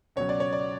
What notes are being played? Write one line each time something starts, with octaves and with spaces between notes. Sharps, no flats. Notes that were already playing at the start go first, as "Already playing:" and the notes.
C#2 B2 F#3 C#5
D5
C#5
D5